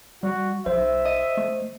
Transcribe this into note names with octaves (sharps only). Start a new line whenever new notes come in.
G3 F#4
B1 C5 E5
D#5
A3